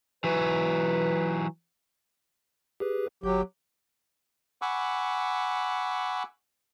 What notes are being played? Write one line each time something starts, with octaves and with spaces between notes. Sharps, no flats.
E3 F#3 B4
G4 G#4 B4
G1 F#3 G4
F#5 G#5 B5 C#6 D6 E6